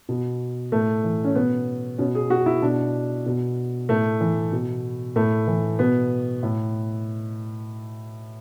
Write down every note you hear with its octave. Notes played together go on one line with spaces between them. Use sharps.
B2
A2 A3
E3
C#4
B2 B3
B2 C#4
G#4
F#4
E4
B2 D4
B2
A2 A3
E3
B2
A2 A3
E3
B2 B3
A2